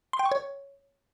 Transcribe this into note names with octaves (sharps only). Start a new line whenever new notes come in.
C6
G5
C#6
C#5